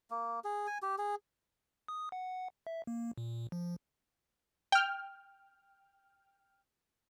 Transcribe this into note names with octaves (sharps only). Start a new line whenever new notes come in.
A#3
G#4
G#5
G4
G#4
D#6
F#5
E5
A#3
A#2
F3
G5 F6